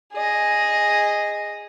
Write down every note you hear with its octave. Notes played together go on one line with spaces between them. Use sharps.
G#4 D#5